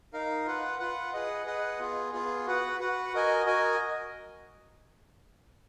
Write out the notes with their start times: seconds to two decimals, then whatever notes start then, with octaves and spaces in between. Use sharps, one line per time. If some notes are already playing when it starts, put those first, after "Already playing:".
0.13 D#4 A#4 F5
0.46 F4 B4 F#5
0.79 F4 B4 F#5
1.13 G#4 B4 D#5 F#5
1.46 G#4 B4 D#5 F#5
1.80 B3 F4 G#4
2.12 B3 F4 G#4
2.46 F#4 B4 F#5
2.79 F#4 B4 F#5
3.13 F#4 A#4 D#5 G#5
3.45 F#4 A#4 D#5 G#5